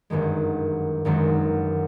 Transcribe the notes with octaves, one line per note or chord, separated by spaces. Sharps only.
G1 F#2 D#3 G#3
G1 F#2 D#3 G#3